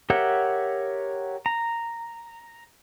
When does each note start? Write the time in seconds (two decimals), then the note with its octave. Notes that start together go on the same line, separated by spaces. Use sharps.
0.10 G4 A#4 C#5 E5 F#5
1.46 A#5